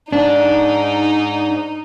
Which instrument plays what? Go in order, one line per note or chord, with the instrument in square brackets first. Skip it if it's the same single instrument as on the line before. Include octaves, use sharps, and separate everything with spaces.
[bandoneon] G#2 [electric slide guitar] D4 [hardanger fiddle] D#4